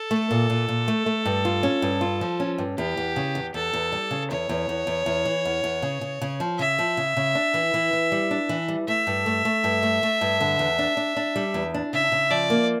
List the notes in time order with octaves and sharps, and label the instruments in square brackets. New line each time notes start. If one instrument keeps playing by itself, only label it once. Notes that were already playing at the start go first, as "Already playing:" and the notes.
Already playing: [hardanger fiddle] A4
[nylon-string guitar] A3
A#2
A#2
A#2
A3
A3
G2
F4
C#4
G2
F4
F3
C#4
G2
[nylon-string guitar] E2 [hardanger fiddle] G4
[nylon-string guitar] E2
C#3
E2
[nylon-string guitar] E2 [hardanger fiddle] A4
[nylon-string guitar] E2
G3
C#3
[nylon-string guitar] E2 [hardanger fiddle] C#5
[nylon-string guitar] E2
E2
E2
E2
E3
E2
E2
C#3
C#3
C#3
F3
[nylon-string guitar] C#3 [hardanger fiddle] E5
[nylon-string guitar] F3
C#3
C#3
D4
E3
E3
E3
G3
D4
E3
G3
[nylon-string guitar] A3 [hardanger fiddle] E5
[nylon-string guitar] G2
A3
A3
G2
A3
A3
G2
D3
E2
D4
D4
D4
G3
E2
D4
[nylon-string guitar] C#3 [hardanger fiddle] E5
[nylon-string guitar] C#3
[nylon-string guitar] F3 [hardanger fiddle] D5
[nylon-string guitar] A#3